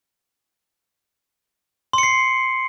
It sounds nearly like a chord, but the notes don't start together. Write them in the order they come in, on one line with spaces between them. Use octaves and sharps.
C6 C#7 C7